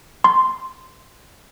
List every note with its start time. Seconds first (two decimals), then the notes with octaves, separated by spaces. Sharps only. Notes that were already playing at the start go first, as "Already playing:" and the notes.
0.24 C6